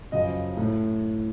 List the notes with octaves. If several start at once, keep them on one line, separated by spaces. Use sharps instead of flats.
F#2 C#3 F3 D#5
A2